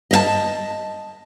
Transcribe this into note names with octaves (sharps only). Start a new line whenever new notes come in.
D#5 E5 A5